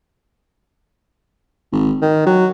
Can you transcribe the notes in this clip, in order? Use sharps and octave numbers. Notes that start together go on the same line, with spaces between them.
G#1
D#3
F#3